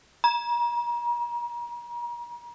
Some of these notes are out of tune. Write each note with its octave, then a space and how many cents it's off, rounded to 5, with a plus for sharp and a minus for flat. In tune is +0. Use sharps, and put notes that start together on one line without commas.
A#5 +40